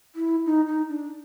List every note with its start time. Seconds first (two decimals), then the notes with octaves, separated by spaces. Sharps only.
0.16 E4
0.46 D#4
0.67 D#4
0.89 D4